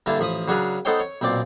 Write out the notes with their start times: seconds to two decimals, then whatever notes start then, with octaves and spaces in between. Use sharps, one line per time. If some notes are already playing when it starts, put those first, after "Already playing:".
0.06 G2 D3 A#3 E4 A5
0.19 A1 F3 B5 D#6
0.48 C#3 F#3 D4 G#4 A#4 B4
0.85 B3 D#4 A4 C5 C#5 G5
1.00 C#5
1.21 B1 A#2 C4 D5 D6